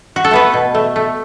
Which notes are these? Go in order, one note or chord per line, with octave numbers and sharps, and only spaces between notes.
F#4
A4
A3 B3 B4
B2
A3
A3